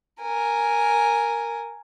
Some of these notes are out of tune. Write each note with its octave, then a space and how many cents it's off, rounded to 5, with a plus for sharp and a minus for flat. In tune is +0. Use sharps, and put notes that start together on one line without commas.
A#4 +0 G#5 +0